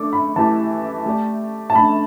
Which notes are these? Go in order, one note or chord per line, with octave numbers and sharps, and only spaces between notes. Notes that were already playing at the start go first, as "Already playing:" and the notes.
Already playing: A3 D4 A4 D5 D6
B5
E3 A3 E4 G4 A5
A3 G4 D5
A5
A3 D4 A4 B5